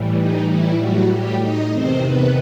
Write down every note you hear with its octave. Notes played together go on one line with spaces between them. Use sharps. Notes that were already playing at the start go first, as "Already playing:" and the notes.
Already playing: A2 E3 G3
D#4
E3 E4
F#3 F#4
G3 G4
D#4 D#5
E2 C3 D#3 C4 C5
B3 B4